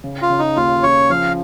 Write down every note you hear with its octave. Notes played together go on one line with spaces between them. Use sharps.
C#3
F4
C#3
D#4
D#2 F4
C#3 C#5
F3 F5